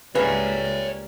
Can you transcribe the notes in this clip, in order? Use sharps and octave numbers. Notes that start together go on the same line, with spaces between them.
C#2 G3 A#3 C#4 G#4 B4 C#5 E5